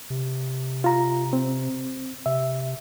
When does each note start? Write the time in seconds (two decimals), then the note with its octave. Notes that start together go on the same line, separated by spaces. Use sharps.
0.10 C3
0.84 F4 A#5
1.33 C4
2.26 C3 E5